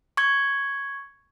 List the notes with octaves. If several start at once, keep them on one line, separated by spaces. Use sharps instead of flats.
C#6 G#6